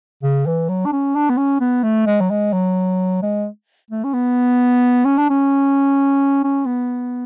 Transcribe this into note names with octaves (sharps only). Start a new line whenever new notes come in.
C#3
E3
F#3
D4
C#4
D4
B3
C#4
B3
A3
G#3
F#3
G#3
F#3
G#3
A3
C#4
B3
C#4
D4
C#4
C#4
B3